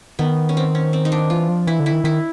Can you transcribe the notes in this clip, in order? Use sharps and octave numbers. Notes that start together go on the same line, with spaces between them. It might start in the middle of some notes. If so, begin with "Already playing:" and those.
D#3 B3
C#4
C4
C#4
C4
D#4
D4
E3 F4
F3
E3 E4
D3
E4
D#3
D#3 E4